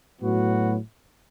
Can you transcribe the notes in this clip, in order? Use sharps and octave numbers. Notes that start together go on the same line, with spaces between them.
A2 F#3 B3 F#4